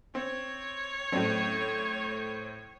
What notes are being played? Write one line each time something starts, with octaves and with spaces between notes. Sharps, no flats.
C4 C#5
A2 F#3 C4 C#4 D5